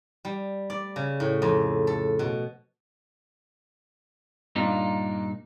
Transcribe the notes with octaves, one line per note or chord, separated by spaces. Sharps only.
G3
D5
C#3
A2
F2
A4
B2
G2 A#2 A#3 D4 D#4 F4